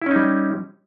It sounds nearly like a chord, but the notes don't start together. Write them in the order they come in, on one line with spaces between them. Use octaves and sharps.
E4 C#4 D#4 G3